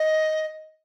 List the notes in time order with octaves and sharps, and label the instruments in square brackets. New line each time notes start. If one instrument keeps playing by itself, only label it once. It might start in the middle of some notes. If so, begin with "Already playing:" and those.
Already playing: [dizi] D#5